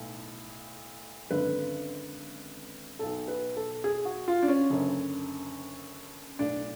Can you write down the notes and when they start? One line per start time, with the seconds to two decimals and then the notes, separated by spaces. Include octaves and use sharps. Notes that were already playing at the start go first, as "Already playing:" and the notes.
Already playing: B1 A2
1.30 G#1 F#2 D3 B4
2.99 B1 B2 A4
3.28 B4
3.56 A4
3.84 G#4
4.05 F#4
4.28 F4
4.43 D4
4.48 C#4
4.70 F#1 F#2 D3
6.39 B1 A2 D4